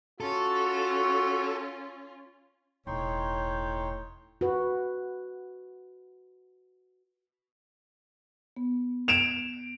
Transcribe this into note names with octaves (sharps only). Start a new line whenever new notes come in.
C#4 F4 F#4 A4
E1 A2 D#4 C#5 G5 C6
F#4 B4
B3
G#6 D7 E7 F7